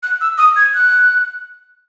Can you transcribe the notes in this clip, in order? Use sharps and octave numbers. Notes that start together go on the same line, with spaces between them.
F#6
E6
D#6
G#6
F#6